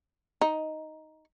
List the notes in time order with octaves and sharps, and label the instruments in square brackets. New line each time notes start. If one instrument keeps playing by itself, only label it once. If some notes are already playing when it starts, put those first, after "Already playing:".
[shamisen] D#4